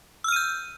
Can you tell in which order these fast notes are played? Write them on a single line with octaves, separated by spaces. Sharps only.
E6 F6 D#7 G6